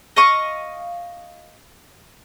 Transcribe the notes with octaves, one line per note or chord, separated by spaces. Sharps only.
D#5 F5 C#6 D#6